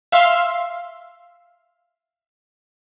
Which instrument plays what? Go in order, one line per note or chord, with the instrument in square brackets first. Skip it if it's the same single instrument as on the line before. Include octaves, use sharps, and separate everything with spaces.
[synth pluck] E5 F5 C6